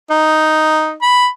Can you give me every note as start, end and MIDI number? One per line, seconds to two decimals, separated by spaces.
0.10 0.94 63
1.02 1.28 83